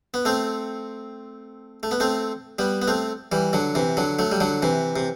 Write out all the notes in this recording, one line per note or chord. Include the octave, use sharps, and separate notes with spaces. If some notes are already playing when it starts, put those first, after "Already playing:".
B3
A3 C4
A3
B3
A3 C4
G3 B3
B3
A3 C4
E3 G3
D3 F#3
C3 E3
D3 F#3
F#3 A3
G3
D3 F#3
C3 E3
C3